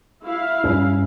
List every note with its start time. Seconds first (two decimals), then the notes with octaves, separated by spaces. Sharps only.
0.24 E4 F5
0.64 G2 C#4